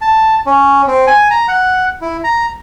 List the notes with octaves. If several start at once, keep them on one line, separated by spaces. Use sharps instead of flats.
A5
C#4
C4
G#5
A#5
F#5
E4
A#5